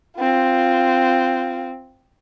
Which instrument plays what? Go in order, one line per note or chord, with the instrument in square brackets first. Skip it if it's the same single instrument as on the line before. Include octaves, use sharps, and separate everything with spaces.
[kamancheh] C4 F4